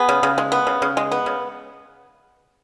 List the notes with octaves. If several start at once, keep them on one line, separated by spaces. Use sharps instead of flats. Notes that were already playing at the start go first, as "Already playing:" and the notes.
Already playing: B3 G#4
C#3
C#3
G#3
B3
C#3
C#3
G#3
B3
C#3